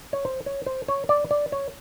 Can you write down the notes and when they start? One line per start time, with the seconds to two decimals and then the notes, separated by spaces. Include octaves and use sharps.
0.13 C#5
0.25 C5
0.46 C#5
0.66 C5
0.88 C#5
1.09 D5
1.31 D5
1.52 C#5